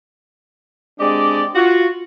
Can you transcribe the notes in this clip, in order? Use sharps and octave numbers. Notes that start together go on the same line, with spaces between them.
G#3 C4 D4 G4 D5 D#5
F4 F#4